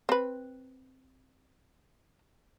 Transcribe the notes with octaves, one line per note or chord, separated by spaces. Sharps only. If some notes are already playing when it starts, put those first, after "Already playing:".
C4 B4